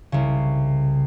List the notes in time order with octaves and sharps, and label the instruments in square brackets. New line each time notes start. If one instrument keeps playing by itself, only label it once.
[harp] C2 C#3